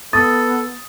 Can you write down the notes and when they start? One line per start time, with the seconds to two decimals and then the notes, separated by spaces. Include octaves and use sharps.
0.13 B3 A4 D#6 A6